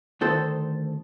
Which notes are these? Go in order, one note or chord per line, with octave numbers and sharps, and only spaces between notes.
D2 D#3 A4 C5